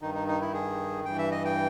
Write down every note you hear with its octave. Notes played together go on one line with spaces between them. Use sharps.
G2 D#3 D#4
D#4
D#4
E4
G#4
G2 E3 G5
E5
D#5
G5